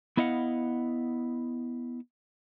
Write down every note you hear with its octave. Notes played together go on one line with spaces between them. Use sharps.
B3 E4 D#5 F5 F#5